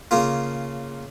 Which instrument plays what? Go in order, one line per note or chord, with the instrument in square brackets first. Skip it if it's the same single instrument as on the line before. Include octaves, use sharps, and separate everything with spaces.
[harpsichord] C#3 A#3 F4